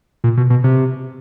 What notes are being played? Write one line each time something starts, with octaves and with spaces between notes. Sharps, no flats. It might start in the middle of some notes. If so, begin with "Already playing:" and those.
A#2
B2
B2
C3